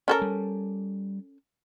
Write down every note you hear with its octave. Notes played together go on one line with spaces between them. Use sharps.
C#4 A4 A#4
G3